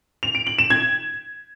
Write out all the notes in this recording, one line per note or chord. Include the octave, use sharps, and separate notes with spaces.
F7
D7
F#7
E7
G#6